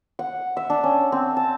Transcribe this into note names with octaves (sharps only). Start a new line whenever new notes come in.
F#5
E5
D4
C#4
C4
A5